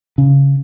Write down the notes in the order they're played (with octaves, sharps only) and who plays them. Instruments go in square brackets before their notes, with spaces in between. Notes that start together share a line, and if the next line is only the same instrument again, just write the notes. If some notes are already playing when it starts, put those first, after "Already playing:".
[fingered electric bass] C#3